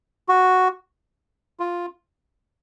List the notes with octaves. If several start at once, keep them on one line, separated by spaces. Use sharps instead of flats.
F#4
F4